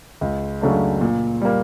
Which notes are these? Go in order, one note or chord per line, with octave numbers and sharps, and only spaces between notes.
C#2
C#3 F#3 A3 D4
A#2
G3 A#3